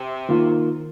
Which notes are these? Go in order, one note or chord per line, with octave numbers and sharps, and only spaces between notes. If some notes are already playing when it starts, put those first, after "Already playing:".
Already playing: C3
D#3 A#3 F4